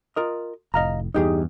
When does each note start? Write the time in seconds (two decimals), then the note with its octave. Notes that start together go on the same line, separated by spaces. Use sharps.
0.16 F4 A#4 D#5
0.74 F1 A2 D#5 F5 A#5
1.14 E2 G2 D#4 G4 G#4